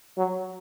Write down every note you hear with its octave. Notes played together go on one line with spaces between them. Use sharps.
F#3